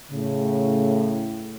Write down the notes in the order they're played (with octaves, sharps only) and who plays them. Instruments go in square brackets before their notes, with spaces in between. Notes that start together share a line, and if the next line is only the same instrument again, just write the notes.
[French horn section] A2 C#3